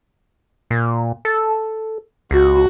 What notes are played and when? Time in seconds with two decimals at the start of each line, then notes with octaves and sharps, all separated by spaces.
0.70 A#2
1.25 A4
2.31 C#2 F#4